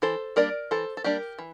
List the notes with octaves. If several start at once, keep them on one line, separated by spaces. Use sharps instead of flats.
E3 A4 C5
G3 A#3 D4 A#4 D5
E3 A4 C5
A4
G3 A#3 D4 G4 A#4
E3